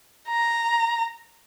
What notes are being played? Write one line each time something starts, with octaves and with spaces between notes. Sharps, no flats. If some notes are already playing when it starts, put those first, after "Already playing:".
A#5